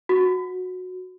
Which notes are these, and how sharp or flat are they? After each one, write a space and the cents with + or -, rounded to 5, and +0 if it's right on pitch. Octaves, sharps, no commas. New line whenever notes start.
F#4 -15